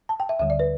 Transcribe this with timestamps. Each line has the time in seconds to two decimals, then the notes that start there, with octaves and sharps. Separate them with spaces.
0.09 A5
0.20 G5
0.29 E5
0.39 D2 D3 G3 E5
0.50 D5
0.60 B4